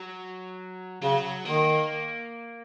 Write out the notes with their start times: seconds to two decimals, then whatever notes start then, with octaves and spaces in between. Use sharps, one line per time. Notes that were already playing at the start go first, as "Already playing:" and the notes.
Already playing: F#3
1.02 C#3 F#3
1.45 D#3 A#3